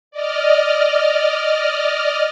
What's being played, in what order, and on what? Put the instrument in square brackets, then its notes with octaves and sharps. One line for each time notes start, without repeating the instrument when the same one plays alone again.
[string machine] D5 D#5 F6